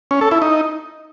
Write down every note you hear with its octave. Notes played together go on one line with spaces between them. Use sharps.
C#4
A4
E4
D#4